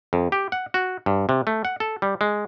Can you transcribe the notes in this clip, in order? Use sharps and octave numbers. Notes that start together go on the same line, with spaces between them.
F2
G4
F#5
F#4
G2
C3
A3
F#5
A4
G3
G#3